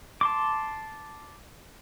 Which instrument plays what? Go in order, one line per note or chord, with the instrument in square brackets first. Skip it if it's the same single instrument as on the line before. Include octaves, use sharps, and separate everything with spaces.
[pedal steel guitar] A5 C6 D6